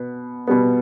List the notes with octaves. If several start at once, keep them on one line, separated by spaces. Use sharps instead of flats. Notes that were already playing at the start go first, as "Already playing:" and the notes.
Already playing: B2 B3
B2 G3 B3